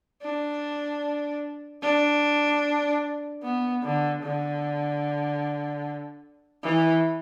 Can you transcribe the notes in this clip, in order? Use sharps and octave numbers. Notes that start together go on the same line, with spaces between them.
D4
D4
B3
D3
D3
E3